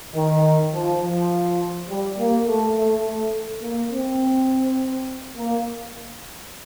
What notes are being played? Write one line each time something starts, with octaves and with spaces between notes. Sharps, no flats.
D#3
F3
F3
G3
A#3
A3
A3
A3
A#3
C4
A#3